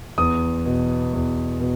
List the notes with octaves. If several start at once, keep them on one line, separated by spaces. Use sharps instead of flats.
E2 D#6
B2
E2
B2